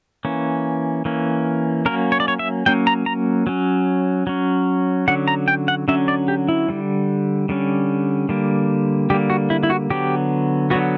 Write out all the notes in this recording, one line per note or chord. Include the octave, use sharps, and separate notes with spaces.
E3 A#3 C#4
E3 A#3 C#4
F#3 A#3 C#4 A#4
C#5
D5
C#5
E5
F#3 A#3 C#4 G5
A#5
A#5
F#3 C#4
F#3 C#4
D3 F#3 C#4 F#5
A#5
G5
F#5
D3 F#3 C#4 E5
D5
G4
E4
D3 G3 C#4
D3 G3 C#4
D3 G3 A#3
D3 G3 A#3 G4
F#4
E4
E4
F#4
D3 F#3 B3 G4
D3 F#3 B3 F#4